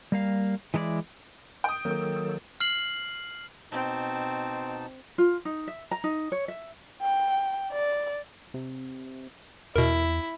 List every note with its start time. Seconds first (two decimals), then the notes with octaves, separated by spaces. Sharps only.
0.12 G3 A#3 F5
0.74 E3 G#3 D4 E4 D5
1.64 G5 D#6
1.85 D#3 F#3 A#3 A4
2.60 F6 C7 F#7
3.72 B2 C4 D#4 A5
5.18 F4
5.45 D#4
5.68 E5
5.91 A#5
6.04 D#4
6.32 C#5
6.48 E5
7.02 G5
7.72 D5
8.54 C3
9.76 E2 B2 E4 A#4